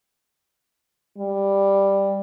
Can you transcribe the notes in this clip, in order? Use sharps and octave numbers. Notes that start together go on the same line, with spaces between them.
G3